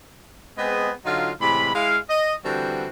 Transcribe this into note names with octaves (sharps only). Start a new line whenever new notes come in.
G#3 B3 C4 G#4 B4 D#5
D3 F#3 D#4 F4
A2 C3 E3 G#3 B5
G#3 E4 F5
D#5
D3 E3 G3 C4 F#4